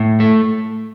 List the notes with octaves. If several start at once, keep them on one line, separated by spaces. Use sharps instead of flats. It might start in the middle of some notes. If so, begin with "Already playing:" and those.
Already playing: A2
A3